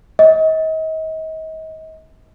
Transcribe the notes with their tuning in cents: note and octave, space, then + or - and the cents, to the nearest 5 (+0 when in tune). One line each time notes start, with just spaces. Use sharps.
D#5 +35